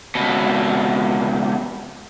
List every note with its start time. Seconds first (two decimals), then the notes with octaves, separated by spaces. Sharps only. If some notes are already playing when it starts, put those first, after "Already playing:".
0.15 C#2 B2